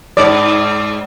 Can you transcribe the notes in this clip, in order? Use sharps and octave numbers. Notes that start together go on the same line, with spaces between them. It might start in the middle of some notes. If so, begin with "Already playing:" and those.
G#2 D5